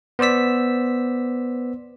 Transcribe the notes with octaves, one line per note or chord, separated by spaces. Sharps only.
B3 C5 D5 E6 B6